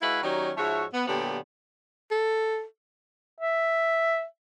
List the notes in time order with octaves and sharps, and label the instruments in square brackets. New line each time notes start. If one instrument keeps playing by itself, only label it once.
[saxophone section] G#3 E4 F#4 B4 E5 F5
D#3 F#3 C#4 D#4 G4 D5
G#2 F3 F#4 C#5 E5
B3
A#2 D3 F#3 B3 G4
[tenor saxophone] A4
[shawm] E5